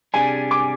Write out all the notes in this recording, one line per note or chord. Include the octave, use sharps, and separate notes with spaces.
C3 G3 D4 G#4 G#5
D6